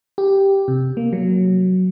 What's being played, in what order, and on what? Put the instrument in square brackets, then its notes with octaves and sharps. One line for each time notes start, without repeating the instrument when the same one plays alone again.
[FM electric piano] G4
C3
A#3
F#3